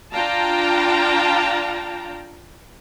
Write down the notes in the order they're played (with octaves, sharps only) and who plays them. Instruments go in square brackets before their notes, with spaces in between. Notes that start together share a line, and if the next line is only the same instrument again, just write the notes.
[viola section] D4 F4 F5 G5 A5 A#5